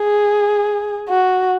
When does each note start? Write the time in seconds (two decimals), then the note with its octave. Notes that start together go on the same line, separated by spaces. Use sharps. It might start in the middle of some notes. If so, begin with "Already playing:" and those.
Already playing: G#4
1.09 F#4